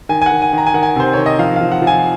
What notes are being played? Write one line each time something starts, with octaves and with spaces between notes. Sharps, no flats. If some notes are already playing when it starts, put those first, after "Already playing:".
D#3 G#5
G#5
F#5
D#3
G#5
D#3 A#5
G#5
D#3 F#5
G#5
C3 C5
D#3 C#5
D#5
F3 F5
F5
F3
F#5
F3
G#5